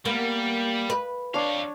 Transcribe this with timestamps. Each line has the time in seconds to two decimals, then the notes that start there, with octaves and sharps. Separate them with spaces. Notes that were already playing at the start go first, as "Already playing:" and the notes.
0.05 G3 A#3 B3
0.90 B4
1.34 F2 D4 C#5 F5